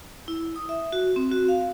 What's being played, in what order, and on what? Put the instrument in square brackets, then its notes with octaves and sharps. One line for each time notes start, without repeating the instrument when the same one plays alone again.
[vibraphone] E4
D#6
E5
F#4
C4
F#4
F5